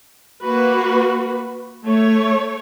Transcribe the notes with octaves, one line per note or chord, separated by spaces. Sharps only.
A#3 F#4 B4
A3 C#5